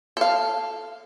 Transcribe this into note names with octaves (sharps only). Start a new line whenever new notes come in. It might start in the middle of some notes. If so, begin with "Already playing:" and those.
A4 F5